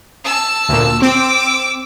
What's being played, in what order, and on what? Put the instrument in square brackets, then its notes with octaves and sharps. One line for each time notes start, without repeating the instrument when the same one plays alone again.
[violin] A5 E6
[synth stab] D2 A#2
[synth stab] C4 [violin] D6 E6